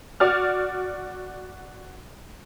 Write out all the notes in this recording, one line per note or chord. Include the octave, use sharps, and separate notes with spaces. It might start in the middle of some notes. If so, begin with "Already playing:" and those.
F#4 D5 F6